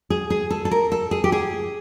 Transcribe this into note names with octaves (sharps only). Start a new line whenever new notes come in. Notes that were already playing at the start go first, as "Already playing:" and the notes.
G#4
G#4
A4
A4
A#4
A4
G#4
G4
G#4